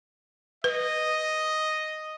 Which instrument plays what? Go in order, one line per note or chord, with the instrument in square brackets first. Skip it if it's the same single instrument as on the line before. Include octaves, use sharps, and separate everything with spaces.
[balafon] B4 [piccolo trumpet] D#5